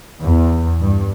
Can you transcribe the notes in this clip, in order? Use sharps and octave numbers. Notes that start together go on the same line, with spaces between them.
E2
G2